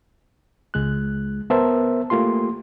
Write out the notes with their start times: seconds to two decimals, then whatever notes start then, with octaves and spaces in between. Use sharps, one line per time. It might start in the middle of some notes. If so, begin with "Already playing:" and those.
0.74 C#2 G#3 F#6
1.50 B3 A#4 C5 E5 A5
2.10 A3 A#3 F4 G4 C6